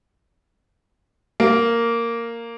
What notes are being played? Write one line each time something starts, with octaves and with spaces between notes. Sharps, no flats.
A#3